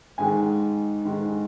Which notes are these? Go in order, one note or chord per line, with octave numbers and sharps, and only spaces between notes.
G#2 D#3 G#3 G#5
G#2 D#3 G#3